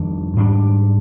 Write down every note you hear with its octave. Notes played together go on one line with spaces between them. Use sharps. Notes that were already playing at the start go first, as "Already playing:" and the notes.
Already playing: F2 D#3 G3 D4
G#2 G3 D4